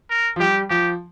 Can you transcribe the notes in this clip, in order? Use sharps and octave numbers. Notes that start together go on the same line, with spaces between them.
A#4
F3
G3 G4
F3 G4